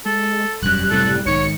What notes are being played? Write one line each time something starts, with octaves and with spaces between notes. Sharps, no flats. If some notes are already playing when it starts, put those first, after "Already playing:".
G#3 A4
E1 F#2 G3 F#6
F#1 A2 C3 A4
B1 G#2 D#3 C#5 C#7